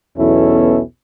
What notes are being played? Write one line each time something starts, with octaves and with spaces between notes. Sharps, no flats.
B1 E2 B2 C#4 E4 A4